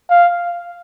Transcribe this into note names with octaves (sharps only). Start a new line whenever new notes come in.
F5